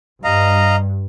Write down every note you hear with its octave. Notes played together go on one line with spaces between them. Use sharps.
G2 D#5 F5 A#5